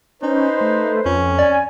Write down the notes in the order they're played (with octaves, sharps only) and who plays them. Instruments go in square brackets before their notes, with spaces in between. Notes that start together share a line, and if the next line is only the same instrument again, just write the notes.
[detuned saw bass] C#4 [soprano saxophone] D#4 [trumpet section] B4 C5
[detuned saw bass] A3
[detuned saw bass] F2 [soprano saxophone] C#4
[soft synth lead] D5 [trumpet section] G#5